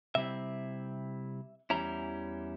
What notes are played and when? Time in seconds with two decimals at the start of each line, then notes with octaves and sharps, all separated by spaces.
0.15 C3 G3 C4 E4 E5
1.70 E2 E3 G3 C#4 E4 A#5